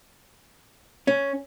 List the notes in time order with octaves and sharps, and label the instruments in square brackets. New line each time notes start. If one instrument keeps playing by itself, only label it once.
[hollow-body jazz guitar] C#4